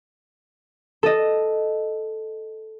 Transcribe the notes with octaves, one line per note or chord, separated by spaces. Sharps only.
A4 D#5